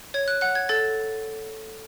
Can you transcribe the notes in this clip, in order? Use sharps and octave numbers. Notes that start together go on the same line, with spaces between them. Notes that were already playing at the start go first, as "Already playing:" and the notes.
C#5 G#6
F#6
F#5 F#6
G#6
A4 A6